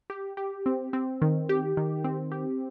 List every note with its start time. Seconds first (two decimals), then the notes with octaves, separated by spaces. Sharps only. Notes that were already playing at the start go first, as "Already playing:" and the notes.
0.10 G4
0.37 G4
0.66 C4
0.93 C4
1.22 D#3
1.49 G4
1.77 D#3
2.04 C4
2.32 G4